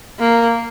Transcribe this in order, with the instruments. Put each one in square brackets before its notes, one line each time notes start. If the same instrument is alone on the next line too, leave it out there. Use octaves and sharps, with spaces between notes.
[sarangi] A#3